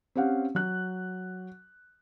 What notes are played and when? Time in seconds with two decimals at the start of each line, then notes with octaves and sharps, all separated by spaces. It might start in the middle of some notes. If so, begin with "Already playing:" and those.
0.15 C4 C#4 G4 F5 F#5
0.55 F#3 F#6